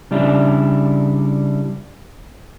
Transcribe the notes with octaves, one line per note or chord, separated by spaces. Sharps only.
C#3 G3 D4 E4